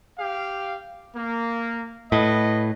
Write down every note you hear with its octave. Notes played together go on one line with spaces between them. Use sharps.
G4 F5
A#3
A2 B4 D#5